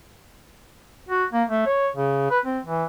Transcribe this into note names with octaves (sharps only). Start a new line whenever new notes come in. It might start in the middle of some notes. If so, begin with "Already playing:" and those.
F#4
A#3
A3
C#5
C#3
B4
C4
E3